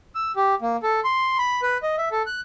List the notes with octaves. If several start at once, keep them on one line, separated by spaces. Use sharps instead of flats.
E6
G4
A#3
A4
C6
B5
B4
D#5
E5
A4
F#6